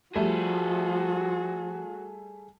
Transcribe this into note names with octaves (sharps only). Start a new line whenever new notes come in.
F3 G3 A3 F#4 G#4 A4